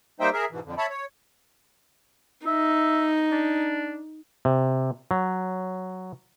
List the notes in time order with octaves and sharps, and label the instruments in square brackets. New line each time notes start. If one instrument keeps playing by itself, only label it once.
[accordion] G3 A#3 D#4 C5 E5 G5
G#4 A#4 E5
G#2 B2 E3
F2 D3
C#5 E5 A5 B5
C#5
[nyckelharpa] D#4 [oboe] E5
[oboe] D4
[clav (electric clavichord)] C3
F#3